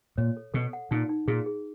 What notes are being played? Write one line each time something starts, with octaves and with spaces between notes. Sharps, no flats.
A#2 C#5
A4
B2 A4
F#5
A#2 D#4
D#4
A#2 G#4
G#4